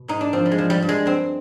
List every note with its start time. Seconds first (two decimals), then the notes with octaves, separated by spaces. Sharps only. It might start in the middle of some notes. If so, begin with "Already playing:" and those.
Already playing: B2
0.08 G#2 D#4
0.21 D4
0.33 F3 C4
0.46 G3
0.51 G#3
0.58 F3
0.70 G3
0.82 G2
0.89 G#3
1.06 G2 C4